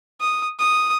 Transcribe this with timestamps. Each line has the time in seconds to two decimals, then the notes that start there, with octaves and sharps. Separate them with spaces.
0.20 D#6
0.59 D#6